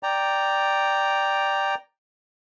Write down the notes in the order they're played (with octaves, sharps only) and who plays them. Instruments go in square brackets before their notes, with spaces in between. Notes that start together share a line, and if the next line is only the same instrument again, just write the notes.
[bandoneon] D5 G5 A#5